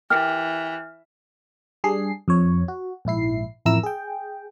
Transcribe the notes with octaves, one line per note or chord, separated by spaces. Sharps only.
E3 G4 A#4 G5 F6
G3 D4 G#4 C7
F2 F3 C#5
F#4
A#1 G#2 E4 C7
A1 F2 E4 A#4 A#5 E6
G#4 G5